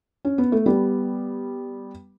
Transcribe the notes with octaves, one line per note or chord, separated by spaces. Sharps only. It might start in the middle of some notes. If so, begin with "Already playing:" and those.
C#4
B3
A3
G3 B3